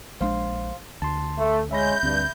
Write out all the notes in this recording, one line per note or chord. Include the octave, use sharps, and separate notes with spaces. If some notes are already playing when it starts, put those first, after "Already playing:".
A#1 G#3 D4 C5 F5 C6
D2 A5 C6
A3
G#3 C#4 E5 B5 G6 A#6
D2 G2 C4